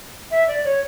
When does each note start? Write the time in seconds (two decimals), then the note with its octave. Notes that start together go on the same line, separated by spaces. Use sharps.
0.31 E5
0.48 D5
0.64 C#5